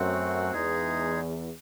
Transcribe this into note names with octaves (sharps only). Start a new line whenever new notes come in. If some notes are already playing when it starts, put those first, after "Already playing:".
Already playing: F#2 A3 C4 F#4 C5 F#5
E2 G#3 D#4 G#4